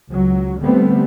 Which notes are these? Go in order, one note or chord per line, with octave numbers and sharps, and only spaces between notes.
C#2 F#3
D3 G3 A3 B3 C4